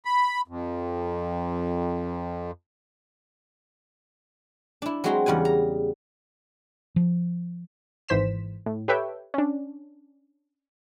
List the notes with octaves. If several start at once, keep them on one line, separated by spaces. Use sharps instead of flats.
B5
F2
D4 E4
F#3 G#3 C4 F#4 A#5 C6
E2 C#3 G3 F#5 G#5
A#5
F3
G#1 G#2 E3 C5 B6 E7
A2
G4 A4 B4 C#5 E5 G5
C#4 D4